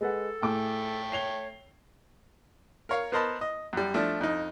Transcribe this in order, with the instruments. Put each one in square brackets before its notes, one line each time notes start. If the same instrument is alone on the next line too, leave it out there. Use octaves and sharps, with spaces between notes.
[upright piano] G#3 B4 F#5 [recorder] A4
[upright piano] A2 G#4 D6 [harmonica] A3 G5
[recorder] C#5 [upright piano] C7 F7 G7
[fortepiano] A#4 C#5 F5
B3 A#4 C5 D#5 A5 B5
D#5
F#2 G3
F3 A3 D4
F2 D#4